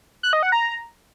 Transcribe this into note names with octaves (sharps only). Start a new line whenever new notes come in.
F#6
D#5
F#5
A#5